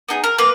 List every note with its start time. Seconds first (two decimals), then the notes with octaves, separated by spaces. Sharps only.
0.09 B3 D#4 G#4
0.24 A#4
0.38 A#3 B4